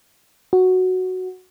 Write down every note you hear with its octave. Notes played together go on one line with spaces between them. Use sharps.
F#4